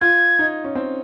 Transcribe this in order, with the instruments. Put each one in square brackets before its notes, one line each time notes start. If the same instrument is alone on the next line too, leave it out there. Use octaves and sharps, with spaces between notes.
[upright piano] F4 [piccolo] G#6
[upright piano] D#4
C#4
C4